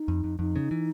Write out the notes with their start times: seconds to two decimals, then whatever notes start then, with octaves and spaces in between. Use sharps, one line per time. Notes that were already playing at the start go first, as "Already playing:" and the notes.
Already playing: D#4
0.08 F2
0.24 F2
0.39 F2 D#4
0.56 C#3
0.71 E3